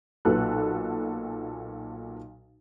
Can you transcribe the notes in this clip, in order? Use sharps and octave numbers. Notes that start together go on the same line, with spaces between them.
B1 A#2 F#4 A4 B4 F#6